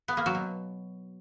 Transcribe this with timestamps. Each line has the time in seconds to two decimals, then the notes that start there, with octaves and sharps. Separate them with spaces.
0.08 B3
0.17 A#3
0.26 F#3
0.35 B2